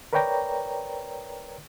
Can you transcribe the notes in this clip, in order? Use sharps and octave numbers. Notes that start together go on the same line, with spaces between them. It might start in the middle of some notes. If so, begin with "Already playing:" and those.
A#4 B4 C#5 D5 G5 A#5